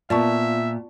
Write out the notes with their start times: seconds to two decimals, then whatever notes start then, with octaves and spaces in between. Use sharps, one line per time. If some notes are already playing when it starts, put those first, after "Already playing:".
0.10 A#2 B3 F4 D5 E5 A5 C#6